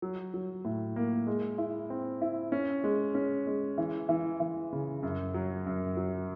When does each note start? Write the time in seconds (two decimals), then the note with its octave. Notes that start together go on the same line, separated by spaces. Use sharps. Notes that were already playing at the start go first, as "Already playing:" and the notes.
0.02 F#3
0.34 F#3
0.65 A2
0.96 A#3
1.27 G#3
1.58 E4
1.90 C4
2.21 E4
2.52 C#4
2.84 G#3
3.15 C#4
3.47 G#3
3.78 E3
4.09 E3
4.40 E3
4.73 C#3
5.03 F#2
5.34 F#3
5.66 F#2
5.97 F#3